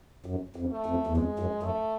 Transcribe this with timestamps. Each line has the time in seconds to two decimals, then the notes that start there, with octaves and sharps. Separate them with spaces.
0.26 F#2
0.56 F2
0.71 A3
0.86 F2
1.07 E2
1.17 F2 G#3
1.39 F#2
1.63 F#2 A3